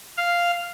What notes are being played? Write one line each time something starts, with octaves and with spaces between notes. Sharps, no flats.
F5